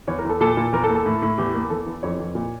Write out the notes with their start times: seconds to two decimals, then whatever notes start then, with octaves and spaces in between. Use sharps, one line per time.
0.07 E2 C#5
0.19 A#4
0.25 E2 A4
0.41 A#2 A4
0.57 A#2
0.72 E2 A#4
0.84 A4
0.89 A#3
0.95 A4
1.06 A2
1.22 A2
1.38 E2 G4
1.54 A#3
1.70 E2 A4
1.86 E2
2.03 F2 C#5
2.20 F2
2.35 A#2